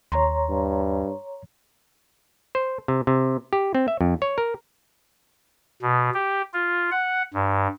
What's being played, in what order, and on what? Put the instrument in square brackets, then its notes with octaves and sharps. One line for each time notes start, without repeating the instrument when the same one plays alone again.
[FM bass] D#2 [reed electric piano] C#5 A#5 C6
[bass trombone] G2
[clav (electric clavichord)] C5
C3
C3
G4
C4
E5
F2
C#5
A#4
[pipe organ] B2
G4
F4
F#5
G2